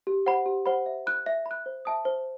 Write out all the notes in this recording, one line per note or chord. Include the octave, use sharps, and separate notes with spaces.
G4
C5 F#5 B5
G4
C5 F#5 B5
E5
B5 F#6
E5
B5
F#6
C5
E5 A5 D#6
C5